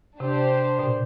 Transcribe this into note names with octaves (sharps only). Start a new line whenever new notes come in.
C3 D4 G4 C5
B2
A#2